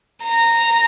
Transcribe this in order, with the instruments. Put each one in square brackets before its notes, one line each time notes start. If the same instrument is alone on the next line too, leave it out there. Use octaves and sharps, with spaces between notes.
[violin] A#5